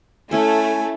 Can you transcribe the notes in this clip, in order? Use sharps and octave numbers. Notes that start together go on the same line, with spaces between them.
A3 C#4 E4 A4 G#5